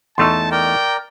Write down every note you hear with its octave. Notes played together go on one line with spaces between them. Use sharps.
E2 A3 D#4 A5 C6 C#6 E6
A#4 D5 G5 A#5